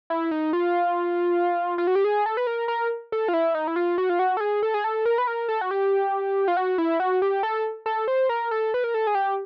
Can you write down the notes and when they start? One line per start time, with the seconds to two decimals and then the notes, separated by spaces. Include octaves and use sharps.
0.10 E4
0.31 D#4
0.53 F4
1.78 F4
1.87 F#4
1.95 G4
2.04 G#4
2.26 A4
2.37 B4
2.47 A#4
2.68 A#4
3.12 A4
3.28 F4
3.33 E4
3.54 D#4
3.67 E4
3.76 F4
3.98 F#4
4.09 F4
4.19 F#4
4.37 A4
4.40 G#4
4.63 A4
4.74 G#4
4.84 A4
5.05 A#4
5.18 B4
5.27 A#4
5.48 A4
5.61 F#4
5.71 G4
6.48 F4
6.57 F#4
6.78 E4
7.00 F#4
7.22 G4
7.43 A4
7.86 A4
8.08 C5
8.29 A#4
8.51 A4
8.74 B4
8.84 A#4
8.94 A4
9.07 G#4
9.15 G4